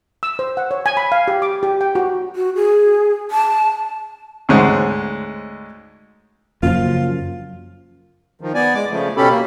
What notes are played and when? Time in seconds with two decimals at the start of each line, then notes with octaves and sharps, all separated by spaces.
0.23 E6
0.39 C5
0.57 F#5
0.71 C#5
0.86 G#5
0.97 B5
1.12 F5
1.28 G4
1.42 D6
1.63 G4
1.81 G5
1.95 F#4
2.36 F#4
2.55 G#4
3.31 A5
4.49 D2 G#2 G#3 C#4 C5 F#5
6.63 F#2 C#3 F3 A#3 F4
8.41 D#3 F3
8.54 B3 D5 G#5
8.75 G#3 D6
8.90 C#3 F3 A3
9.17 B2 C#4 G4 A4 B5
9.29 A#3